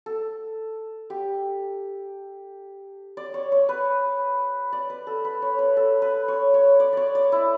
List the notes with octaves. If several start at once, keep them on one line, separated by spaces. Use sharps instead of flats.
A4
G4
D5
C#5
C#5
B4
D5
B4
A4
B4
C#5
B4
A4
B4
C#5
C#5
D5
C#5 D5
D5
E4